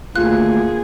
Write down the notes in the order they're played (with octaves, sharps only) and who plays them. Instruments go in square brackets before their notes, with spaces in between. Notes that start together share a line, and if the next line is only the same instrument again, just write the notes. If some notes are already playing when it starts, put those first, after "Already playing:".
[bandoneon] D2 [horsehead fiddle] A#3 G#4 [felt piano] F4 [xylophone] F#6